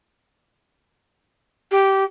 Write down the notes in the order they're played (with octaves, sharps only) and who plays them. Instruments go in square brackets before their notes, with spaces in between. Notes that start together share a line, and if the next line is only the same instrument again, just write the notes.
[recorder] G4